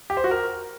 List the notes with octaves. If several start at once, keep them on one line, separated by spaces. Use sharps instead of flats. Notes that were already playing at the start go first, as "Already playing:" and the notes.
G4
C5
F#4
A#4